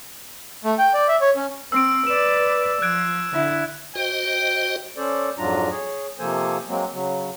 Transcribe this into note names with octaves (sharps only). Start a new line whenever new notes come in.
A3
G5
D5
E5
C#5
C#4
C4 E6 D7
B4 D5 E7
F3 F#6 G#6 D7
D3 E4
F#4 C5 D#5 G5
C#4 A4 C5 D5
F2 G#2 F#3 D4 F4 A#5
G#4 C#5
C3 F3 A#3 A4 C5 G#5
F#3 G#3 A#3 C4
C#3 F#3